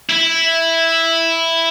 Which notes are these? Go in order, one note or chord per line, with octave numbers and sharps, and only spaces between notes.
E4